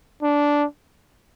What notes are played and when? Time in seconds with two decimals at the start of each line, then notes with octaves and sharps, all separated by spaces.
0.22 D4